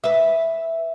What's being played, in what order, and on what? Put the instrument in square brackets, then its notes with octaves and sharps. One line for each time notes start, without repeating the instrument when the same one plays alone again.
[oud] B4 E5